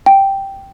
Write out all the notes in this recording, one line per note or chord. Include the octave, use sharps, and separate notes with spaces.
G5